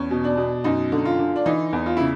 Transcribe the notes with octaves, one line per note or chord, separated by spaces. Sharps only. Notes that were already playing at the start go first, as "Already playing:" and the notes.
Already playing: E2 C#4
B2
D4
B2
F#2 D#4
D3
F4
D3
D4
E3 D#4
E2
F4
C#3 E4